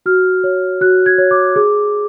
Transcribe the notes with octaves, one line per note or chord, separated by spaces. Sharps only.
F#4 F6
C#5
F#4 F#6
G#6
C#5
D6
G#4 D6